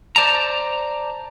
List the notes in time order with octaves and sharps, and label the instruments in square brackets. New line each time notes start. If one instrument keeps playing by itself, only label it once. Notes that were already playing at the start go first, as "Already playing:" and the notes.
[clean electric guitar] C5 D5 A5 A#5